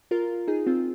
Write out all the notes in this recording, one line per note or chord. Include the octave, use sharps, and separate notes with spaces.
F4 A#4
D#4 G#4
C4 F4